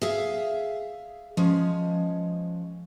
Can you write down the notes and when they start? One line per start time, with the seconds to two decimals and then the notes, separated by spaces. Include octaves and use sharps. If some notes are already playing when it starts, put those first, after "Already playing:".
0.01 G#4 E5 F5
1.37 F3 G#3 C#4